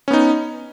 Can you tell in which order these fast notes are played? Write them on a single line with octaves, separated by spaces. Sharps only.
C#4 B3 D#4